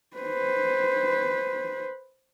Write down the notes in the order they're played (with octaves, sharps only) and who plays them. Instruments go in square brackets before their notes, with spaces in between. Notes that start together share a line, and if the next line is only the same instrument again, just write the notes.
[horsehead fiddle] B4 C5